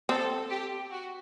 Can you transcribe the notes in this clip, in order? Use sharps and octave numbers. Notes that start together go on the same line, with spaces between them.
C4 A4
G4
F#4